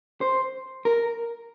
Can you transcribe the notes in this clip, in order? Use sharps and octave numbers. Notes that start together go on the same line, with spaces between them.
C5
A#4